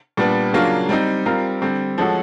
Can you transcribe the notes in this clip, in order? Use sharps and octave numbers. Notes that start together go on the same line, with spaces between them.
A#2 G3 B3 D4
C#3 F#3 A#3 D4 F4
G3 C4 D#4
G3 C4 F4 A#4
D3 G3 C4
F3 G#3 C#4 F#4 A4